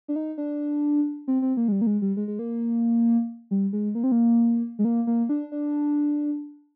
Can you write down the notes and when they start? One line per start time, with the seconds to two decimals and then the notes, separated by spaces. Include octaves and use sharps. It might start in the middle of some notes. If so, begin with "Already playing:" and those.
0.08 D4
0.16 D#4
0.38 D4
1.28 C4
1.42 C4
1.57 A#3
1.68 G#3
1.72 G3
1.81 A#3
1.87 G#3
2.02 G3
2.17 G#3
2.28 G#3
2.39 A#3
3.51 G3
3.73 G#3
3.95 A#3
4.04 C4
4.12 A#3
4.79 G#3
4.85 A#3
5.07 A#3
5.29 D4
5.52 D4